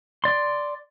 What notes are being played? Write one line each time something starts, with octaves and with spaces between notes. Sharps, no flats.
D5 C6